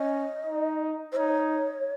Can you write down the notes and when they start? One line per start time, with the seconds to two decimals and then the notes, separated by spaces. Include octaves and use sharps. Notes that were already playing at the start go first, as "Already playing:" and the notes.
Already playing: C#4 D#5
0.47 D#4
1.12 C5
1.17 D#4 C#5